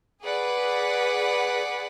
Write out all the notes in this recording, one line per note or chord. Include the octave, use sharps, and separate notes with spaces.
G#4 B4 D5 F#5